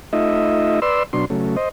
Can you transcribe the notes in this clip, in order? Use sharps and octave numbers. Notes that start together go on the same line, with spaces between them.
A3 D#4 F4 D#5 E5
B4 D5 C6 E6
B2 F#3 D4 C6
C#3 F#3 A3
C5 D#5